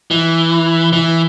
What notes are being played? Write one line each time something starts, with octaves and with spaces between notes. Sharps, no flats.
E3
E3